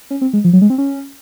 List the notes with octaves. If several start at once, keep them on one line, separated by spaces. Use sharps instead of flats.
C#4
C4
G#3
F3
F#3
G#3
C4
C#4